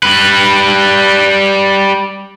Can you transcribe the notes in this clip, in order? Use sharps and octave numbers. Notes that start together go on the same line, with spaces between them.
G3 B4